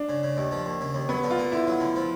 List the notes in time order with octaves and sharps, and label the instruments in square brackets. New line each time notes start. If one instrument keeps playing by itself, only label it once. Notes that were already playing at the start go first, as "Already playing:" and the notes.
Already playing: [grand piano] D4
[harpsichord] C#3
C#3
D#2
F3
D#2
C#3
D#2
[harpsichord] F#3 [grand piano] B3
[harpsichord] D3
[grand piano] F4
[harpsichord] A#3
[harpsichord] D3 [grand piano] E4
[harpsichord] F#3
D3
F3